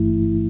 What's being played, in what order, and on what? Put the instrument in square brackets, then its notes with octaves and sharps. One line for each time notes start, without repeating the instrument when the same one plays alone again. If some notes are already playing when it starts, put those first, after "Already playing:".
Already playing: [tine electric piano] G1 G2 E3 A3 E4